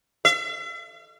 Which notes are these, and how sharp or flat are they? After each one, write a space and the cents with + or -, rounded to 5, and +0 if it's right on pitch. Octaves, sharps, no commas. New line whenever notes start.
E5 +45